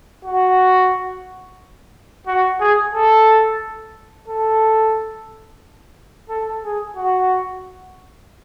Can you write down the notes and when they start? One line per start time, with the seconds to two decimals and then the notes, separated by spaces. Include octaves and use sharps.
0.25 F#4
2.27 F#4
2.60 G#4
2.94 A4
4.28 A4
6.29 A4
6.64 G#4
6.96 F#4